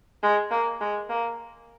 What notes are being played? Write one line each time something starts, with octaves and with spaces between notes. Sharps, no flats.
G#3
A#3
G#3
A#3